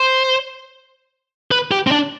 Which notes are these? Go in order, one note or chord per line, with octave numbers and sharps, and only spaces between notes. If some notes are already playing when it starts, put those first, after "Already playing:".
Already playing: C5
B4
G4
C4
D4